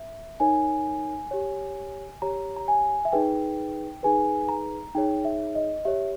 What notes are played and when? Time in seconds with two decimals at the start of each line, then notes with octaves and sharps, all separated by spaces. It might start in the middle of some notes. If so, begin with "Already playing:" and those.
Already playing: E5
0.40 D#4 A#4 C#5 G#5
1.31 G4 C#5
2.22 G4 C#5 A#5
2.56 A#5
2.68 G#5
3.05 E5
3.12 D#4 G#4 B4 G5
4.03 D#4 G#4 B4 G#5
4.49 A#5
4.95 D#4 G#4 C#5 G5
5.25 E5
5.55 D#5
5.85 G4 C#5 E5